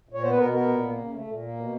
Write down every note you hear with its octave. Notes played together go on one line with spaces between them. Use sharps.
A#2
C#5
B3 C5
B4
B2 A#4
B3 A#4
A#2
A#3
C#3
A3
A#2
A#3
B2